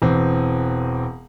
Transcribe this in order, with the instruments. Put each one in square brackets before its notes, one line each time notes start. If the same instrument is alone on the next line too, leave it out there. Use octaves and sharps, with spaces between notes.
[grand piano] E1 E3 C4